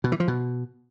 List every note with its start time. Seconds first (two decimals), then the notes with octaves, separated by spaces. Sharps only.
0.04 B2
0.12 E3
0.20 F3
0.28 B2